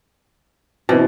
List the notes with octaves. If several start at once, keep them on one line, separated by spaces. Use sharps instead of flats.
B2 E3 C4